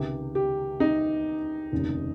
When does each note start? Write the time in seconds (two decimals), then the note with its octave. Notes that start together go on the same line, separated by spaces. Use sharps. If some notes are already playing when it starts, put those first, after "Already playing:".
Already playing: C#2 C3 D#3 G4
0.35 G4
0.80 D#4
1.72 F1 D#2 C#3